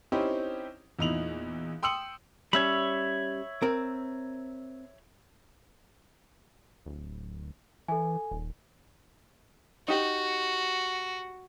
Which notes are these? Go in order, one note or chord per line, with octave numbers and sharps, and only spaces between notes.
C4 C#4 D#4 E4 G4 C5
E2 A#2 D#4 E4 F7 F#7
G5 C6 D#6 E6 C#7 F#7
G3 C#4 C#5 E5 B5
C4 A#4
D1
E3 A4 G#5
D#1
D#4 F#4 G4